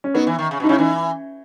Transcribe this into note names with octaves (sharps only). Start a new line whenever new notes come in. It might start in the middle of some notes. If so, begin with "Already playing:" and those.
C#4
F#3 B3 D#4
E3
D#3
C#3
B2
D#4
C#3 C#4 E4
E3 D#4